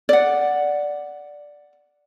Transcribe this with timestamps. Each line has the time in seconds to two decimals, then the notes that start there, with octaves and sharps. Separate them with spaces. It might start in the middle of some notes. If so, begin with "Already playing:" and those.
0.09 D5 F#5